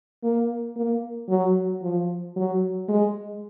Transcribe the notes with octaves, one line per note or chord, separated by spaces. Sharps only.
A#3
A#3
F#3
F3
F#3
G#3